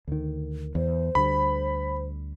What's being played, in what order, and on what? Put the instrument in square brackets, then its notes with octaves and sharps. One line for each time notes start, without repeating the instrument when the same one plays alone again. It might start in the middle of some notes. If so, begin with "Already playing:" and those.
[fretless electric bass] D2 D#3
[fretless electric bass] E2 [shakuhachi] C5
[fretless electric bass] D2 D3 G3 [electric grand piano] B5